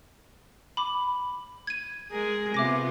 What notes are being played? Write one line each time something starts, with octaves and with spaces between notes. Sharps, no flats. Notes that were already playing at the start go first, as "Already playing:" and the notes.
B5 D6
G#6 D#7
G#3 G#4 A#4
C3 B3 F4 E5 D6 A#6